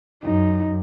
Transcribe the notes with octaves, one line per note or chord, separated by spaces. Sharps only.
F#2 D#4